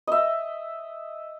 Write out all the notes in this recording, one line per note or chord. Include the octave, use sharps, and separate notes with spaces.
D#5 E5